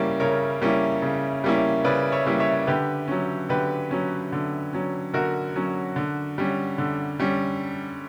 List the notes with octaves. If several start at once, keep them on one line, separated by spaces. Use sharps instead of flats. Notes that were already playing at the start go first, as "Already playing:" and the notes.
Already playing: C#3 G3 A#3 C#4 E4
C#3 A#4 C#5
G3 A#3 C#4 E4
C#3
G3 A#3 C#4 E4
C#3 B4 D5
C#5 E5
G3 A#3 C#4 E4
C#5 E5
D3 G4 B4
F#3 C#4
D3 G4 B4
F#3 C#4
D3
F#3 C#4
D3 F#4 A#4
F#3 C#4
D3
G3 C#4
D3
G3 C#4